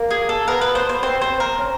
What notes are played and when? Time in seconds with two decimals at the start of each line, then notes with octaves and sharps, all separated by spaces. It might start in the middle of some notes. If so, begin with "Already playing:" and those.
Already playing: A#3
0.11 G#4
0.29 A4
0.48 B3 A#4
0.61 B4
0.75 C5
0.89 C5
1.03 C4 C5
1.22 C5
1.40 A#4
1.59 C#4